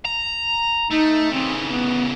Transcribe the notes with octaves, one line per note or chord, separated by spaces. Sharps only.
A#5
A3 D#4
C#3 E3 C4
B3